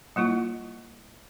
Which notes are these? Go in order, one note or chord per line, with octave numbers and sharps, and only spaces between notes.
G3 A#3 E4 F4